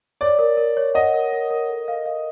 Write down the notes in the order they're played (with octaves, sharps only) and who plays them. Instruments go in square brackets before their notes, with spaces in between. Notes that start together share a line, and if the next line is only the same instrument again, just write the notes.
[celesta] C#5 [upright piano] D5
[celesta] A#4
A#4
C#5
[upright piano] D#5 [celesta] F#5
[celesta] A#4
A#4
A#4
A4
F5
F5